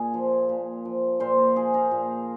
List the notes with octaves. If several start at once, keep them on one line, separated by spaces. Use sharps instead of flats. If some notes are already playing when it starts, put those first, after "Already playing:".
Already playing: A#2 G#4
F3
A#2
F3
A#2 C5
A#4
F3 G#4
A#4
A#2